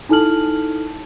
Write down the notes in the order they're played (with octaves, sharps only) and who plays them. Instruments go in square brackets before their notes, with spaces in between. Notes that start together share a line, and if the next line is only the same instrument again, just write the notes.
[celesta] D#4 E4 A4 A5 F6 F#7